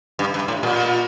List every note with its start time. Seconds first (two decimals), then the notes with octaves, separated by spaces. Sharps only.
0.19 G2
0.34 G2
0.48 A2
0.63 A#2